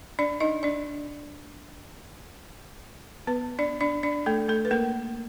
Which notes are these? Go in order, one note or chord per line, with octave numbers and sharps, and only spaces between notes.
D4 D5
D#4 D#5
D4 D5
B3 B4
D4 D5
D4 D5
D4 D5
A3 A4
A3 A4
B4
A#3 A#4